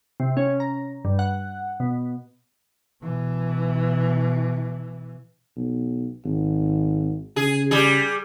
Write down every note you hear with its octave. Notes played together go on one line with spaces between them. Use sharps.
C3
C#4
A#5
G2
F#5
B2
B2 E3
B1
G#1
C#3 G#4
G3 G#4